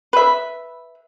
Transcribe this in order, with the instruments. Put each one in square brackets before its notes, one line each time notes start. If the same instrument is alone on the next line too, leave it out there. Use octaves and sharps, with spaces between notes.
[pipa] B4 E5